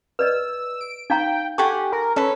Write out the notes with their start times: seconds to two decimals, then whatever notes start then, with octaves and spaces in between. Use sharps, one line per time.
0.19 B4 D5 D#5 E6
0.81 D7
1.10 D#4 F5 G5 A#5
1.58 G4 A4 F#5 G#5 C#6
1.93 A#4
2.16 C#4 A4 B4